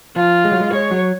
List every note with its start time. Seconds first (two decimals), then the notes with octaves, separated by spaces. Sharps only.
0.16 F3 F4
0.45 G#3
0.52 F#3
0.60 G#3
0.73 G#3 C#5
0.91 F#3